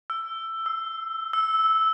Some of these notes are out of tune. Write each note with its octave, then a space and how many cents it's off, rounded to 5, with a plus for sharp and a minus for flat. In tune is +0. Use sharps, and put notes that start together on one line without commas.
E6 +15
E6 -25
E6 -10